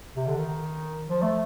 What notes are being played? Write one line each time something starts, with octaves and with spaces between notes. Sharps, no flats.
C3
D3
D#3
F3
A3